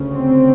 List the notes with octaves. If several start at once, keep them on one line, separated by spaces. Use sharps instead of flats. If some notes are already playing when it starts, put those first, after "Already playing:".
Already playing: D2 C#3
C4